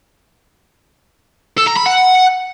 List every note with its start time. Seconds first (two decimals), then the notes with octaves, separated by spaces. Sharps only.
1.58 A4
1.67 A#5
1.77 B5
1.86 F#5